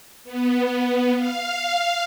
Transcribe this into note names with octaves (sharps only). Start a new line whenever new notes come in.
B3
F5